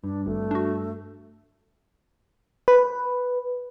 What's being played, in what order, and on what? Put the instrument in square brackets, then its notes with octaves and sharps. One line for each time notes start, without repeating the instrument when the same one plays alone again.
[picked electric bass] G2 [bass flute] D4
[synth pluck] G#1 [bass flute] A3
[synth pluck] D4 F#4
[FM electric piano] B4